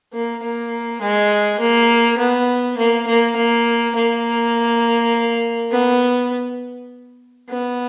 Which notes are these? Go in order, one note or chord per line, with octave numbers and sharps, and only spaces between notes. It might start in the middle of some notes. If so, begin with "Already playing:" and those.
A#3
A#3
G#3
A#3
B3
A#3
A#3
A#3
A#3
B3
B3